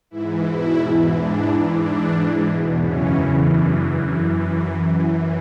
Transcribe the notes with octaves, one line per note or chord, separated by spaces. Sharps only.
G#2 E3 E4
E2 B2 E4
G#2 E3
G#2 E3 D4
G#2 E3
G#2 E3 D4
G#2 E3
E2 B2
F#2 C#3 E3 C#4
E2 C#3 E3
F#2 E3 D4